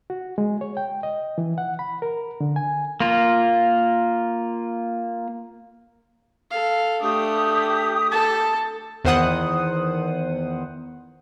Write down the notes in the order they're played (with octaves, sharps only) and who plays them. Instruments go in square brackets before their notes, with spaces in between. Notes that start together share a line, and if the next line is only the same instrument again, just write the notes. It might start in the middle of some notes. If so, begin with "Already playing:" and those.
[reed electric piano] F#4
G#3
C#5
G5
D#5
E3
F#5
B5
A#4
D3
G#5
[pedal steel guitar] A#3 F4
[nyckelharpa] A4 F5
[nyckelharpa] A3 D4 [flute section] G4 D#6
[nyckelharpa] A4 A5
[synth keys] E2 D#3 C5 F#5 D#6